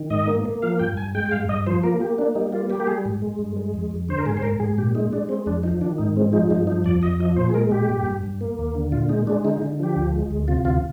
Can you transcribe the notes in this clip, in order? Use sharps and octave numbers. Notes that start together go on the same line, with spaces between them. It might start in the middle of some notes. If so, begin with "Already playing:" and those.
Already playing: D#3
G#2 D#5
A#3
A#3
F3 F5
G2 G5
G2 G#5
G#3 G5
G5
G2 F5
G2 D#5
F3 C5
A#3 A#4
A#3 G4
A#3 D4
G3 D#4
A#3 F4
A#3 G4
G4
G3 G#4
G#2
G#3
G2
G#3
F2
F2
D3 C5
A#4
G#2 G#4
C5
G#2 A#4
G#2 G#4
A#2 G4
G#3 D#4
G#3 D4
G#3 C4
F2 D4
F3 D#4
D#3 D4
G#2 D#4
G#3 C4
F3 D#4
G2 D#4
F3 D#4
F2 D5
F2 D#5
F3 D#5
A#2 C5
G#4
G#3 A#4
A#2 G4
G2
G2
G2
A#3
D#2
D3
A#2 F4
G#3 D#4
G#3 D4
D3 D#4
D#4
D3
F3 G4
D2
G#3
D2
C3 F4
D2 F4